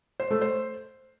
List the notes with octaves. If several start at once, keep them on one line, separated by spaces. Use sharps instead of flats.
C5
A3
C5